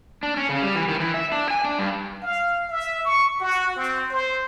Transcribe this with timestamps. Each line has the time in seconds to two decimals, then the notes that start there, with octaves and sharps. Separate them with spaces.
0.23 D4
0.37 C#4
0.49 C#3
0.62 G3
0.75 E3
0.88 D#3
1.00 E3
1.14 E5
1.32 D4
1.50 G#5
1.64 D4
1.79 G2
2.22 F5
2.69 E5
3.04 C#6
3.40 F#4
3.76 C4
4.11 C5